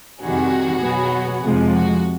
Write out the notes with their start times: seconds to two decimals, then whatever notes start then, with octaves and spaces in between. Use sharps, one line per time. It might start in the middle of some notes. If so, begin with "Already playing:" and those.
0.21 F2 C3 D#3 G3 F#4 G#4
0.82 B2 F#3 B3
1.43 F2 C3 F3 G#3
1.73 F#4